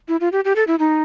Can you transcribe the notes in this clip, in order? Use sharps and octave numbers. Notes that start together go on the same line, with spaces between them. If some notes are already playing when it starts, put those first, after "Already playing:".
E4
F4
G4
G4
A4
E4
D#4